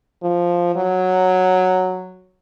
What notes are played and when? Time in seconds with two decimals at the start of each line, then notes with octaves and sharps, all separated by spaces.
0.23 F3
0.76 F#3